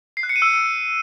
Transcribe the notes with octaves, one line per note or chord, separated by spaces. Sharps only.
C7
F#6
C#7
D#7
E6